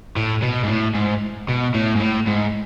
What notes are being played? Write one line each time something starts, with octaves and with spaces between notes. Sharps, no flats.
A2
B2
G#2
A2
G#2
B2
A2
G#2
A2
G#2